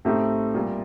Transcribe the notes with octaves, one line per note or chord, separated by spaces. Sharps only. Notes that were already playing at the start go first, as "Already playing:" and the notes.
A2 A3 C4 D#4 G4
A#2 G3 A#3 F4